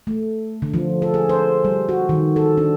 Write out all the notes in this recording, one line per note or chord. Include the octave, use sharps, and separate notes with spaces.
A3
D3
F3
A4
G#4
C5
G3
F#4
D#3
A4
D4